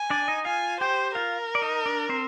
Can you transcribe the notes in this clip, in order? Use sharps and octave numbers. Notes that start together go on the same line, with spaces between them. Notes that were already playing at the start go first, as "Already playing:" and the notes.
Already playing: G#5
D4 D5
D#4 D#5
F4 F5 G#5
G4 C5 G5
F4 A#4 F5
D5
D#4 D#5
D4 D5
C4 C5